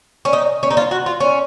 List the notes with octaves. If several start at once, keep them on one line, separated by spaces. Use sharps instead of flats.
C#4
D#4
C#4
D#4
F4
F#4
F4
C#4